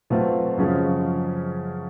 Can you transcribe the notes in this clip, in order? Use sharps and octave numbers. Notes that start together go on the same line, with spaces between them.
B2 F#3 A3 C4 F4
F#2 C#3 F3 G#3 C#4